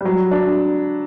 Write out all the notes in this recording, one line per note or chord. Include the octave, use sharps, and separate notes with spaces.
G3
F#3
D4